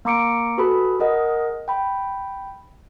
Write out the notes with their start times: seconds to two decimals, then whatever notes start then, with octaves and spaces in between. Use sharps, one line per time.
0.05 A#3 A#5 D6 C#7 D7
0.58 F#4 G#4 A4 B4 B5
1.00 G#4 A#4 D#5 F#5
1.68 G5 B5